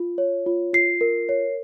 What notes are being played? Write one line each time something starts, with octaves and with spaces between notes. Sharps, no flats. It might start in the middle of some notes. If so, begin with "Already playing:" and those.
Already playing: F4
C#5
F4
F4 C7
A#4
C#5